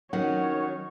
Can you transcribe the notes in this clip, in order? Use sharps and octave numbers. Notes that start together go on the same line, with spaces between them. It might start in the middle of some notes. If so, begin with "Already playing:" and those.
D#3 F#3 C#4 C#5 F#5